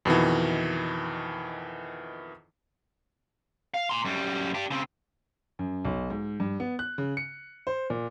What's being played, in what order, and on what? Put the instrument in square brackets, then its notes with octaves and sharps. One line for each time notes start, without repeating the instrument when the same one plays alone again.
[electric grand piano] F2 B2 D#3 E3
[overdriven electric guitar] F5
A#5 C6
F#2 G3
D4 G4
C#3 C4
[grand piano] F#2
B1
G#2
G2
B3
F#6
C#3
C#7
C5
A#2